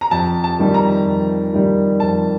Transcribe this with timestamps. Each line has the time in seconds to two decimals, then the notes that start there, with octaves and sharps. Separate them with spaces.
0.01 A#5
0.11 F2 A5
0.44 A5
0.59 D#3 G3
0.74 A#5
1.06 F2
1.53 D#3 G3
2.00 F2 A5